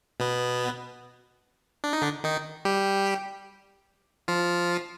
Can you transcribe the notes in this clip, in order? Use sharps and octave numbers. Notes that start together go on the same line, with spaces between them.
B2 B3
D4
D#4
D3 D4
D#3 D#4
G3 G4
F3 F4